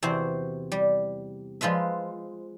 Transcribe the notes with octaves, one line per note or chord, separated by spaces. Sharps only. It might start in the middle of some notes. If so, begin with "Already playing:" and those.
E2 C3 C4 F#4 C5
G3
F3 G#3 F4 B4 E5